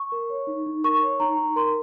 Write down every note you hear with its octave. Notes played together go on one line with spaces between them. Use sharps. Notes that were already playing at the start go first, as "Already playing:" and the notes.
Already playing: C#6
A#4
C#5
D#4
D#4
A#4 C#6
C#5
D#4 A#5
D#4
A#4 C6